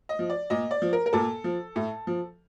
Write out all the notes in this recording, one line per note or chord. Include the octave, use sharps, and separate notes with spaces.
D#5
F3
D5
A#2 D#5
D5
F3
A#4
A#4
A#2 A4
F3
A2
F3